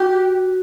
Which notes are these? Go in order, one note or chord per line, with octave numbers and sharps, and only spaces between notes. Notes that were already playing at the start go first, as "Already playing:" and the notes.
Already playing: F#4 G4